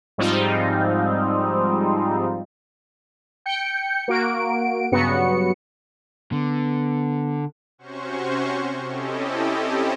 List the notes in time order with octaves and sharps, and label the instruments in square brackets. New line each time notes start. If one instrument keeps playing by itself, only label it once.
[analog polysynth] G#2 F3 G3 C4 D#4 F4
G5 G6 C#7
A#3 F#4 D7
G2 C#3 F#3 B3 F#4 C#7
[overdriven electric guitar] D3 [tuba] B3
[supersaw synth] C3 C#4 F#4 C5 C#6
C4 C#4 E4 G4 A4 D#5